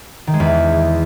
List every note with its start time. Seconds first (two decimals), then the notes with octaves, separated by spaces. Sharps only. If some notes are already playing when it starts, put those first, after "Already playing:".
0.27 D#3
0.34 G#3
0.40 E2